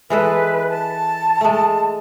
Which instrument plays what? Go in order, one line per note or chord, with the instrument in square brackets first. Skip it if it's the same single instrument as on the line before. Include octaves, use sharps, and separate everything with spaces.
[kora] E3 G#3 A4 [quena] B4
[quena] A5
[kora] G#3 A3